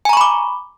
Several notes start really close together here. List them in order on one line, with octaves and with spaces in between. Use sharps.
G#5 A#5 C#6 B5 D6